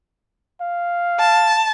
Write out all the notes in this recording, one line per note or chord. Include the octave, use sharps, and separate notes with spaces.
F5
A5